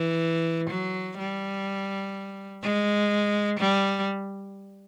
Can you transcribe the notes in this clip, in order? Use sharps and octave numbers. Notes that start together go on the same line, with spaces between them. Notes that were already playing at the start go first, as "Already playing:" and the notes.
Already playing: E3
F#3
G3
G#3
G3